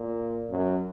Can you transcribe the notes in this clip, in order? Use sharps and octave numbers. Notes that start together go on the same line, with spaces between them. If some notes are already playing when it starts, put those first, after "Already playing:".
Already playing: A#2
F#2